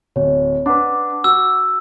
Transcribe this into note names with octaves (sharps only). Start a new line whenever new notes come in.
D1 C#5
D4 B4 F#5 D6
F#4 E6